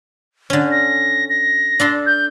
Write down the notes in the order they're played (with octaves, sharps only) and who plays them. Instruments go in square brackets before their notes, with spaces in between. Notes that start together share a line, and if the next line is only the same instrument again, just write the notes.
[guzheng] D3 C#4
[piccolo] A#6
A#6
[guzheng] D4 A4 C6
[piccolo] G6